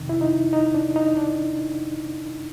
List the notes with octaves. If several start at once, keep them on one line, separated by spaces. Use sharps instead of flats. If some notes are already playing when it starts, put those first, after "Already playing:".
Already playing: F2 C3 D#3
E4
D#4
D#4
D4
D#4
D4